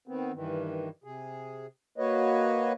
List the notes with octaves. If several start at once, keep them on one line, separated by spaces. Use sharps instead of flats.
D#3 B3 C4
G2 D#3 E3
C3 G#4
A#3 F#4 B4 C#5 D#5